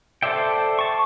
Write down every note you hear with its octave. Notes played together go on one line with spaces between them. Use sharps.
A4 C5 D5 E5 G5
A5 C#6